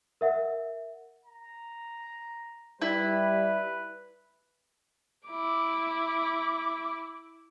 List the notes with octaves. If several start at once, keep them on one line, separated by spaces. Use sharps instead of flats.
A#4 E5 F#5
A#5
G3 E4 B4
E4 D6